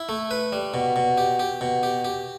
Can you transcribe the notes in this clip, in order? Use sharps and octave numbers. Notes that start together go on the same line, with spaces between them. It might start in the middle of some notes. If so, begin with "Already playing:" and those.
Already playing: E4
A3
B4
G3
B2
B2
G4
G4
B2
G4
G4